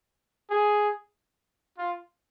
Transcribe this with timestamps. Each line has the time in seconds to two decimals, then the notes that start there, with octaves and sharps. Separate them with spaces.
0.50 G#4
1.78 F4